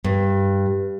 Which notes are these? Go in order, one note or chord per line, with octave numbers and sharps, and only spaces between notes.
G2